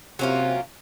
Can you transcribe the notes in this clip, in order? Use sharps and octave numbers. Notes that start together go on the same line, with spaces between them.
C3 F#3 A#3 C#4 F4